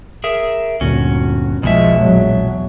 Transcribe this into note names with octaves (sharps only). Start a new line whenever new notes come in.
G#4 A#4 E5
G1 D2 A#2 C#4 F#4
B1 E2 B2 F3 G#3 E5
A#1 F#3 G#3